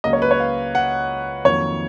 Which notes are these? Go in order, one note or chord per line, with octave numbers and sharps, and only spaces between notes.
C#2 C#3 F#3 A#3 D#5
C#5
B4
C#5
F5
F#5
F2 D#3 F#3 A#3 C#5